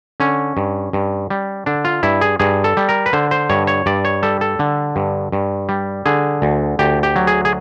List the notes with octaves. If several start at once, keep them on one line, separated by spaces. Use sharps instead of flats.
D3 C#4
G2
G2
G3
D3 D4
F4
G2 E4
G#4
G2 G#4
A4
G3
A#4
B4
D3 C5
C5
G2 C#5
C#5
G2 D5
C#5
G3 A4
A4
D3
G2
G2
G3
D3 G#4
D2
D2 G4
G4
F#3
G#4
G#4